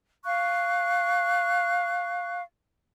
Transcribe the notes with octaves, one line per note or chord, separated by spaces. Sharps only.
F5 C#6 F#6